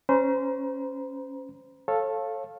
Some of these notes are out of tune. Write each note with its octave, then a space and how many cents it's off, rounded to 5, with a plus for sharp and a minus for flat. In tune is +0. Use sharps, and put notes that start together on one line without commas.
C#4 -5 C5 -30 A#5 +30
A4 +0 C#5 -30 F5 +0